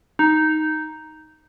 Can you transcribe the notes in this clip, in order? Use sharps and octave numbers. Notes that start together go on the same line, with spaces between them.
D#4